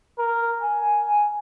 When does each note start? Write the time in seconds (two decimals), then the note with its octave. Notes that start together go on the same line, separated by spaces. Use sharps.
0.19 A#4
0.62 G#5